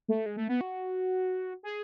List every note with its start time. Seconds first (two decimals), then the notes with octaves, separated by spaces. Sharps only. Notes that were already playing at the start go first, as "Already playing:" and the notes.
0.08 A3
0.26 G#3
0.37 A3
0.49 B3
0.61 F#4
1.63 G#4